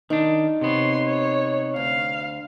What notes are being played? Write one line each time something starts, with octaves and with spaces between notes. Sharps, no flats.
D#3 D4 D#4
C3 B3 C#5 C6
C#5
D2 F5